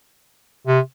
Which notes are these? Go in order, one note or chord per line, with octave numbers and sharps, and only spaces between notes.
C3